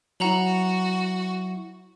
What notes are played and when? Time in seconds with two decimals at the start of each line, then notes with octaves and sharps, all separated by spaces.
0.20 F#3 E4 F#4 F#5 A#5 F#7